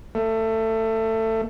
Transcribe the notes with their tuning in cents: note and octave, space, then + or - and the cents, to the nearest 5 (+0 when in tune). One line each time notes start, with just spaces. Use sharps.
A3 +20